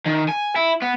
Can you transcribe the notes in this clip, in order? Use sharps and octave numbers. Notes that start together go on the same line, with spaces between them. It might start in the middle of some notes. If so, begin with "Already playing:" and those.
D#3
G#5
E4
B3